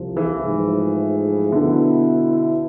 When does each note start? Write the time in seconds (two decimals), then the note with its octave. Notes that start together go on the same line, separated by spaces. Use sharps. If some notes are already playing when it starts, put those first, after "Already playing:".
Already playing: C2 C3 F3
0.17 E3
0.44 G#2 F3 A3 E4 G#4
1.52 B2 D3 B3 E4